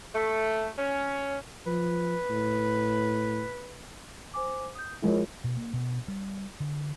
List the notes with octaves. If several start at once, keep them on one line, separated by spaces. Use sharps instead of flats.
A3
C#4
F3 B4
A2
C5 G#5 D6
D#6 G6
F3 G#3 E4 G#4 A#4 C#5
B2
A#3
B2
G3
D3